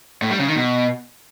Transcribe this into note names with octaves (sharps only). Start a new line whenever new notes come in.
A2
G3
C#3
D#3
B2